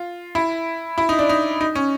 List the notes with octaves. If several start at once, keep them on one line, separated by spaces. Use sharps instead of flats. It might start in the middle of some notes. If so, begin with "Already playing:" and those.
Already playing: F4
E4
E4
D#4
D4
D#4
D#4
C#4